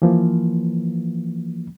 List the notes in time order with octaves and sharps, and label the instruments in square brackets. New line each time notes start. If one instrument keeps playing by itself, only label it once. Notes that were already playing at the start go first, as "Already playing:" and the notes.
[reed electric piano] E3 F3 A#3